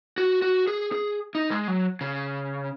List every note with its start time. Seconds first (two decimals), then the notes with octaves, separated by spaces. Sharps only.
0.18 F#4
0.42 F#4
0.67 G#4
0.92 G#4
1.35 D#4
1.51 G#3
1.68 F#3
2.01 C#3